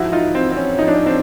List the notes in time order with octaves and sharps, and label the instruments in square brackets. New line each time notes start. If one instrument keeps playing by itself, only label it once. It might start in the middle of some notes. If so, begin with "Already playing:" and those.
Already playing: [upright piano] G#2 F3 E4 F#4
D#4 F4
C4
C4
C#4
G#2 F3 D#4
D4
C#4
C4 D4